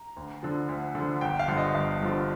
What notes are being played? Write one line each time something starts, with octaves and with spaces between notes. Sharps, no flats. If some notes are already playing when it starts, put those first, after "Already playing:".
Already playing: A#5
D2
D3 F3
D2
D3 F3
G1 G5
F5
G2 D3 F3
D#5
G1 F5
G2 D3 F3